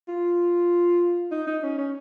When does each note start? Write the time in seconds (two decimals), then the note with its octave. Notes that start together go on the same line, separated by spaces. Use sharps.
0.08 F4
1.31 D#4
1.47 D#4
1.63 C#4
1.78 C#4